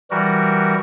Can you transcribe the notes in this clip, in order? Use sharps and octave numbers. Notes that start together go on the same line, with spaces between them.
E3 G3 F#4 A#4